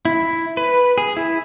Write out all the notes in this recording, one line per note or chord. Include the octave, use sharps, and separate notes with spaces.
E4
B4
G#4
E4